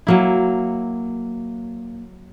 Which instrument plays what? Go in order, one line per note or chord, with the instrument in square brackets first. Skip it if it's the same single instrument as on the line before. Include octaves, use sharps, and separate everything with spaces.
[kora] F#3 A#3 E4